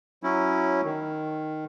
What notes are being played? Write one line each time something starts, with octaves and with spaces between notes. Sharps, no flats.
F#3 C#4 E4
D#3